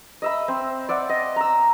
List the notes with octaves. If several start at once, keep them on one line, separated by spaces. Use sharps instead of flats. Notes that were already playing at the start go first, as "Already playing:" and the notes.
D#5 E5 B5
C4
D5 E5 F#5
D#5
A#5 E6